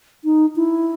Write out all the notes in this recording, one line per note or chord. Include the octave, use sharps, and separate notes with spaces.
D#4
E4